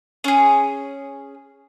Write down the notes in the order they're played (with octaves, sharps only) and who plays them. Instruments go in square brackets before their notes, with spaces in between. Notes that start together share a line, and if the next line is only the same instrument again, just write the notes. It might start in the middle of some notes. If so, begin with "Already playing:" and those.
[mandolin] C#4 G#4